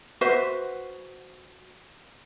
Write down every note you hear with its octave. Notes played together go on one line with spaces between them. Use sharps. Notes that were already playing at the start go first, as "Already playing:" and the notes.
F#4 B4 C5 E5